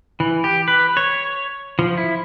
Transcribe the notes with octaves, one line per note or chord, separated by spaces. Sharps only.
E3
G4
B4
C#5
F3
E4